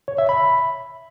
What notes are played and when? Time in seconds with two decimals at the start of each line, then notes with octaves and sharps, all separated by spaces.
0.08 C#5
0.18 E5
0.29 B5